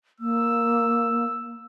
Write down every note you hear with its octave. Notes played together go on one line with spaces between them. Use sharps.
A#3 E6